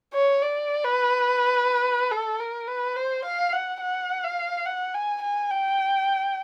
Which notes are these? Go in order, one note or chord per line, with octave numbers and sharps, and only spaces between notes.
C#5
D5
B4
A4
A#4
B4
C5
F5
F#5
F#5
F5
F#5
G#5
G#5
G5